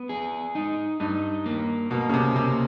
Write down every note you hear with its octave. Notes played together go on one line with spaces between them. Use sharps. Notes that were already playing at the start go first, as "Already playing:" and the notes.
Already playing: B3
G#4
D#4
G2 D#4
A#3
B2 A#3
C#3
C3
C3 A#3